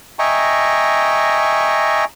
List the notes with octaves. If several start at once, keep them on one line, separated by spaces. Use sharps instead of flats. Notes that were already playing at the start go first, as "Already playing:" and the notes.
D#5 E5 G5 G#5 A#5 C#6